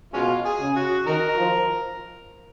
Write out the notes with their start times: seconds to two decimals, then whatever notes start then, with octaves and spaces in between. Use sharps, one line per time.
0.14 B2 G#3 C#4 F4
0.45 G#4
0.60 C#3
0.76 F#4
1.06 D#3 D#4 F#4 A#4
1.38 F3